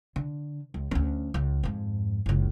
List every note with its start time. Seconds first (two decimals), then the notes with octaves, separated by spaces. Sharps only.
0.16 D3
0.74 C#2
0.91 D2 C#4
1.34 C#2
1.63 F2 G#2
2.26 F#1 C#2